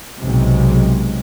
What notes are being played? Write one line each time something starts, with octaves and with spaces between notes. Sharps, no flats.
B1 C3 G#3